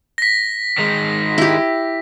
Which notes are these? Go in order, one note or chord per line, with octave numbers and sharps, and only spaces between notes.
A#6 B6
D#3 G#3
E4 G4